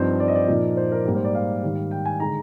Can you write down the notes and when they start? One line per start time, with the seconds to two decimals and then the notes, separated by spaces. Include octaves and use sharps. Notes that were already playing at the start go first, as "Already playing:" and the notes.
Already playing: G2 F3 C4 D#4 C5
0.20 D5
0.28 D#5
0.35 D5
0.48 A#2 F3 A#3 D#4
0.77 C5
0.92 A#4
1.05 G#2 G3 A#3
1.16 C5
1.25 D5
1.35 F5
1.63 G#2 D#3 G3
1.91 G5
2.05 G#5
2.20 D3 G#3 D#4 A#5